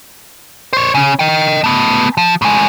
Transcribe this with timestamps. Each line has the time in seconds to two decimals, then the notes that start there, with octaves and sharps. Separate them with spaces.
0.73 C5 C#5
0.95 C#3 C#4
1.19 D#5 G5
1.64 A3 B3
2.17 F3
2.42 A2 G#3